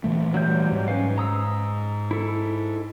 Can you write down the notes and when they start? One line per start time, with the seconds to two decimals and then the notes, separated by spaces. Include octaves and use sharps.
0.04 A#2 E3 A3
0.34 F#3 G3 G6
0.72 G#2
0.88 C#4 B4 F5
1.18 A#5 D#6 E6
2.11 E4 A4